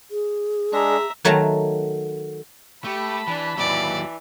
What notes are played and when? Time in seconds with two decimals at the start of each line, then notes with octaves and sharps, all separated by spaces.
0.11 G#4
0.73 G#3 D4 E5 A#5
1.25 D#3 F#3 A3 A5 A#5
2.84 A3 G4 A5 B5
3.27 E3 D4
3.58 D#2 E3 F#3 D5